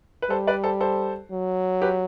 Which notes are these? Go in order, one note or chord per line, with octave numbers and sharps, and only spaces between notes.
B4
G3 A4 C5
B4 D5
A4 C5
A4 C5
F#3
G4 B4